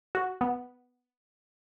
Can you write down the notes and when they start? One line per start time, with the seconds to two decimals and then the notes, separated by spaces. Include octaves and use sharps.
0.15 F#4
0.41 B3